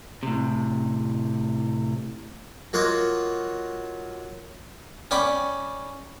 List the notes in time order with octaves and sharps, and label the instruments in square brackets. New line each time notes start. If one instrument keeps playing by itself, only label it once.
[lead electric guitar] A2 C3
[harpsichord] F#3 A#3 F4 F#4 D#5
C#4 D5 G5 B5